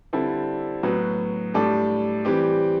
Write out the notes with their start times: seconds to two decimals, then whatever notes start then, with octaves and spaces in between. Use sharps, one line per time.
0.13 D3 G3 C4 E4 A4
0.83 A2 F#3 B3 F#4 B4
1.54 A2 G3 D4 A4 D5
2.25 E3 G3 C4 G4